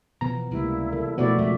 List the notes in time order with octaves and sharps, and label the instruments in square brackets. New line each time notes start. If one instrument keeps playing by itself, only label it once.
[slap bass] B2 E3 F3 [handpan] B3 [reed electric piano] A#5
[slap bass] C#2 [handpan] C3 G3 A#3 [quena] E4
[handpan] E3 A4 A#4
[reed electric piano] B2 A3 [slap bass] F3 [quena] E4 [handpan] F#4 D5 F#5
[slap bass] F2 [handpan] C#3 F3 G#3 [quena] E5